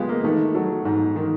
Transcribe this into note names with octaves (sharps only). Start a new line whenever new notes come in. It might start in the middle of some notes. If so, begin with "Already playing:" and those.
Already playing: C#3 G#3 B3 F4 G4
A#3
D#3 A3
F#3 A3
G#2
D#3